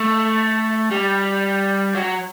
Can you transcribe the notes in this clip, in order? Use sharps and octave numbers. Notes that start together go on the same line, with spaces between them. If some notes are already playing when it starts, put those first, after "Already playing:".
Already playing: A3
G3
F#3